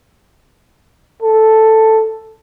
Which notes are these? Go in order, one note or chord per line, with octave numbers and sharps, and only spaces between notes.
A4